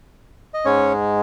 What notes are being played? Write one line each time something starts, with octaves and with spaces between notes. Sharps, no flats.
D#5
G#2 G#3 C#4 C#5